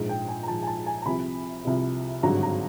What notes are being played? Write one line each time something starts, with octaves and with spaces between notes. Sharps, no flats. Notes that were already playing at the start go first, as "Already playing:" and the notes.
Already playing: A#1 G#2 F3
G5
G#5
A#5
A#1 G#2 F3 A5
G#5
A5
G#5
A#5
C2 C3 F3 B5
C2 C3 F3
G#1 G2 D3 F#3 A#5
A#5